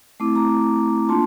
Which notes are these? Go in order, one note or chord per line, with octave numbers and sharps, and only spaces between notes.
A3 C4 E4 D6
A#5 D6
A#3 D4 F4 A5 C6